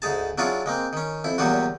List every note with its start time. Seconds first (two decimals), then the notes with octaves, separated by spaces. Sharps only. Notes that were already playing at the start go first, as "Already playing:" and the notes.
0.02 D2 G#2 G#4 A5
0.38 F#3 D4 E4 F4 G#4 C#5
0.66 G#3 A#3 C4
0.93 D#3 C#4
1.24 F2 E4
1.38 E2 A#2 F#3 G3 B3 F#4